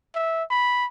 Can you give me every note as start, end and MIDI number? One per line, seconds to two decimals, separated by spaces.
0.15 0.43 76
0.50 0.86 83